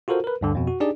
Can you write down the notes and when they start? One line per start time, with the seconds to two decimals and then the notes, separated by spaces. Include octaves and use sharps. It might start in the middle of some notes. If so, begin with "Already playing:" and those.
0.08 F4 F#4 A4 A#4 C5
0.24 A#4 B4
0.41 D2 G2 D3
0.55 F2 B2
0.67 F#4
0.80 D4 D#4 G4 G#4 D5